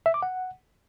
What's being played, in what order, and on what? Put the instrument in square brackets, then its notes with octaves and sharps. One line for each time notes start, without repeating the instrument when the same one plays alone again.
[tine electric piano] E5
D6
F#5